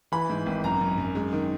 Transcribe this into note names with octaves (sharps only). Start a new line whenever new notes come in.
E3 B5
G#2
G#1
F#2 A#5
F#2
F#2
G#3
D#3